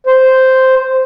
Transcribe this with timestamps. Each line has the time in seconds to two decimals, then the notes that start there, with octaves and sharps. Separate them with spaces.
0.07 C5